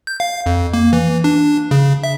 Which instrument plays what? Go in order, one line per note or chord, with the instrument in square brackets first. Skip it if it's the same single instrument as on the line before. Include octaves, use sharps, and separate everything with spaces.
[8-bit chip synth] G6
F5
F2
A#3
E3
D4
C#3
E5